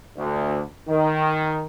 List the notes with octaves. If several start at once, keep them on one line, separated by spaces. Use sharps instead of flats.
D2
D#3